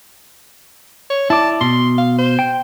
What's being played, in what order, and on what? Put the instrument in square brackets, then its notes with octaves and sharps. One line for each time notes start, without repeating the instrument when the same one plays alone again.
[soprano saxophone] C#5
[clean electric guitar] E4 D5 [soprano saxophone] A5
[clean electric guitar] B2 [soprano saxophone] C6
[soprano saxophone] F5
C5
[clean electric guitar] G5